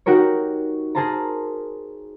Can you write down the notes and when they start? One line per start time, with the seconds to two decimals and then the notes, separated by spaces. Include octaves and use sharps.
0.06 D#4 F#4 G4 A#4 C#5
0.95 G#4 A#4 C5 A5 A#5